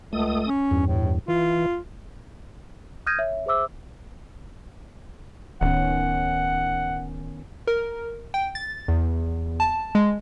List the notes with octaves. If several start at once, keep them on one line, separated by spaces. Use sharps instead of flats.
C#2 A3 D#6
C#4
E2 G2
A2
E3 F4
D#6 F6 G6 G#6 A#6 D#7
C#5 E5
G#4 C5 E5 D6 E6
D1 D#3 B3 C#4 F#5
A#4
G5
A6
E2
A5
G#3